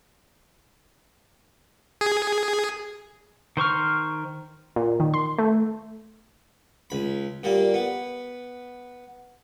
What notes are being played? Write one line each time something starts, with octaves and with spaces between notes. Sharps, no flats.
G#4
D#3 C5 C#6 F6
A#2
D#3
C6
A3
C#2 B5
A#2 G3 A#3
B3